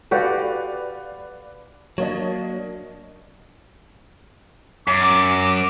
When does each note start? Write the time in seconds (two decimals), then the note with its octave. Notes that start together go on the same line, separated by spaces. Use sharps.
0.11 F#4 G4 A4 B4 D5 F5
1.98 F#3 A#3 D4 C#5 D#5
4.88 F#2 D6